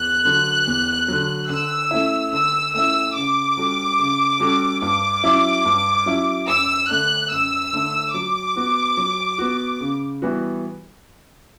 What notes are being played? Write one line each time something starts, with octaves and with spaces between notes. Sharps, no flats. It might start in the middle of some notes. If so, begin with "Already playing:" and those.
Already playing: E2 F#6
D3 F#3
E2
D3 F#3
D3 E6
A3 C#4 E4
D3 E6
A3 C#4 E4 E6
C#3 D6
G3 C#4 F#4 A4
C#3
G3 C#4 F#4 A4
G2 D6
F#3 C#4 E4
G2
F#3 C#4 E4
F#2 E6
D3 A3 D4 F#6
F#2 E6
D3 A3 D4
F#3 D6
B3 F#4
F#3
B3 F#4
C#3
E3 G3 B3 F#4